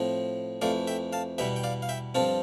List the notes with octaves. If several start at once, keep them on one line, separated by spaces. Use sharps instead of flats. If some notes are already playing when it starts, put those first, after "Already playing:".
Already playing: A2 F3 C4
F2 E3 A3 D5 F5
E5 G5
F5 A5
E2 B2 G3 E5 G5
G5
D5 F5
F5
E5 G5
G2 F3 C4 F4 A4